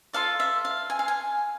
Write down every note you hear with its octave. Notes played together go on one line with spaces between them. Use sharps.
F4 A4 D5 F5
E5
F5
G#5
F5
G#5